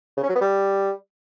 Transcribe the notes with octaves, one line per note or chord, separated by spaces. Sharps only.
C#3
C#4
F#3
B3
G3